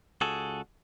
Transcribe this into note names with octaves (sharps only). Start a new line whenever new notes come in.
C#2 F#4 G#4 A4